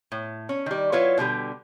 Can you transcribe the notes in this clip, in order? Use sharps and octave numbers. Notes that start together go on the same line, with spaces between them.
A2
C#4
D#3 G3
F#3 E4 F4 B4 C#5
B2 D3 G3 G4